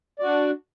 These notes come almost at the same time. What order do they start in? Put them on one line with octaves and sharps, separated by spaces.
D5 F#4 D4